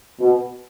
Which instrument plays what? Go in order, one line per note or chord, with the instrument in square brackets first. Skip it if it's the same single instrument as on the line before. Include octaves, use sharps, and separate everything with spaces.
[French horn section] B2